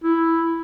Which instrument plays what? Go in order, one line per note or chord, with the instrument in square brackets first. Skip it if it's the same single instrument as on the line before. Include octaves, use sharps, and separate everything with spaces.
[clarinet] E4